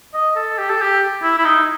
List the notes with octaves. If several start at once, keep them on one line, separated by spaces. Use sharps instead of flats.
D#5
A4
G4
A4
G4
E4
E4
D#4